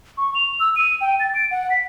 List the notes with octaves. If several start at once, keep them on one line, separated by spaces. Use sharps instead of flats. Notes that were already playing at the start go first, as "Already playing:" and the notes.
C#6
F7
E6
D#7
G5
A6
D7
F#5
B6